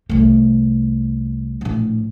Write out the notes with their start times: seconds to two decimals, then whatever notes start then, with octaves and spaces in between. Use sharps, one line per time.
0.09 C2 A3
1.61 A#1 A2